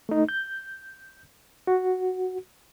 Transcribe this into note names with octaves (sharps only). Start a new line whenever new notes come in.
A3 D#4
G6
F#4